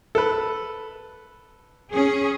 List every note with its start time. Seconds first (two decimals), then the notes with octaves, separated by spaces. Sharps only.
0.15 A4 B4
1.93 C#4 G#4